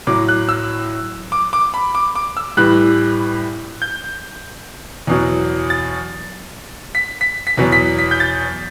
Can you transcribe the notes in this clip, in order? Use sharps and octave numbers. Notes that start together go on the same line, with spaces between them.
A2 F#3 D6
F#6
E6
D6
D6
B5
D6
D6
E6
A2 E3 G3 F#6
G6
E2 B2 F#3
A6
B6
B6
B6
E2 B2 F#3
B6
B6
G6
A6